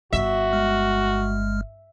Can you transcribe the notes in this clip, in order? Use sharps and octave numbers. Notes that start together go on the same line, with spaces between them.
G1 F#4 E5
G#3 F6